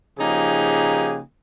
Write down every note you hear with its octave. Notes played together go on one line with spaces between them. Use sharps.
C#3 F3 A#3 D#4 G4 G#4